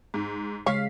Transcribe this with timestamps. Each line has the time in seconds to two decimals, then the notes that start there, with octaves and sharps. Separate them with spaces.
0.14 G#2
0.66 C#3 G#3 C#5 F5 B6